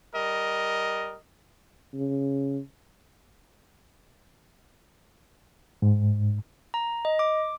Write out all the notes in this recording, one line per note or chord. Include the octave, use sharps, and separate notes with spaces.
G3 A#4 D#5
C#3
G#2
A#5
D#5
D6